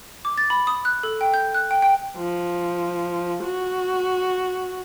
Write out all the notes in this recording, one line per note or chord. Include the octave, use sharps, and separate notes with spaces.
D6
A6
B5
D#6
F#6
A4
G5
G6
F#6
G5
G5
F3
F#4